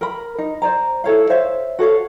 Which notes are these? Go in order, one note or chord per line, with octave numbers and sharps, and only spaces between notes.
A#4 B5
D#4
C5 D5 A#5
E4 A4 C#5 F5
C5 C#5 E5 F5
F#4 A4 C#5 F5